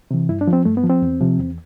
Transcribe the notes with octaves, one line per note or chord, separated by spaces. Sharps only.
C3 E3
G2 E4
D4
F3
C4
G2 A3
B3
F3
C4
E2
C3 F3
E2